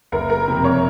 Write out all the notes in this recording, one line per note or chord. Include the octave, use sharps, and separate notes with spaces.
F#1 A#4
A#4
F2 C3
C#5